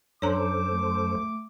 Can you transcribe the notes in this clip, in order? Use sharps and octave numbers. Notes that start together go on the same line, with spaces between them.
F#2 D4 A4 C5 C#5 A#5 D6
A3